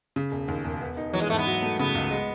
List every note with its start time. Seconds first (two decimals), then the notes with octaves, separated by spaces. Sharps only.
0.16 C#3
0.32 E1
0.48 D#2
0.65 E1
0.81 B3
0.97 D#4
1.13 E3 F#3
1.21 G#3
1.29 G#2 A3
1.38 B3
1.47 F#3
1.62 A3
1.79 C#3 B3
1.95 C#2
2.11 G#3